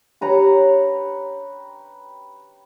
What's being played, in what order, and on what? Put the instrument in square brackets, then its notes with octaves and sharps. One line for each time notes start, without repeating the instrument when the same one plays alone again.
[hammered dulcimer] G4 B4 C#5 A#5